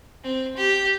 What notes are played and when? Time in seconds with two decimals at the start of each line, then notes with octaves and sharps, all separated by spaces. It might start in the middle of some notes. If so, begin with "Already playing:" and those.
0.24 C4
0.56 G4